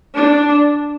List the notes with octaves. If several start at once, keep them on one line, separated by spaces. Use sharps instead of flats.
D4